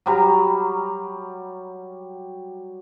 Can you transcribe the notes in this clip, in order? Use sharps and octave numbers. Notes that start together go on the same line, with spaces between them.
F#3 G3 A#5